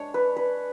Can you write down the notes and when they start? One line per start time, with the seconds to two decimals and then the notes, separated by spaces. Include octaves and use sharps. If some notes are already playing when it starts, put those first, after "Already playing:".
Already playing: G#3 D4 C#5
0.14 B4
0.36 B4